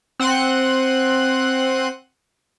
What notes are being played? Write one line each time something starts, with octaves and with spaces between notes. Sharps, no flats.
C4 F#5 C6 F#6 D#7